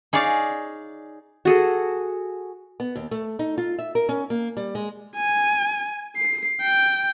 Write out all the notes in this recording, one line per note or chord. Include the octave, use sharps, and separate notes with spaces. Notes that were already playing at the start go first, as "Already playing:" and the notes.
D#4 G#4 C#5 D5 F5
F#4 G#4 A4
B3
D#2
A3
D#4
F4
E5
A#4
C#4
A#3
G3
G#3
G#5
C7
G5